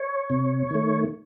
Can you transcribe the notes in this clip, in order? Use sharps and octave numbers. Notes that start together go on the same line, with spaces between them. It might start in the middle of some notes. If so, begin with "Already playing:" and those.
Already playing: C#5
C3
D#3 A3